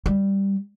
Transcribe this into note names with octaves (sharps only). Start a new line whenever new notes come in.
G3